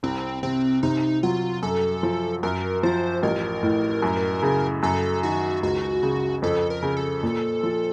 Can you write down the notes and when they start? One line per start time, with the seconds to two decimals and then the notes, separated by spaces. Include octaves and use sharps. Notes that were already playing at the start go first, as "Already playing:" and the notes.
0.03 C2 C4
0.43 C3 C4
0.83 C3 D#4
1.23 F#3 F4
1.63 F#2 A4
2.03 F3
2.43 F#2 A#4
2.83 F3 C5
3.23 A1 A#4
3.63 A2
4.03 F#2
4.42 C#3
4.83 F#2 A4
5.23 D#3 F#4
5.63 C#2 F#4
6.03 C#3
6.42 F2 A4
6.70 A#4
6.83 C#3
6.97 A4
7.23 A#2
7.63 F3